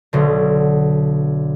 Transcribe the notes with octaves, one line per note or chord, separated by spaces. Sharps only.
B1 B2 D3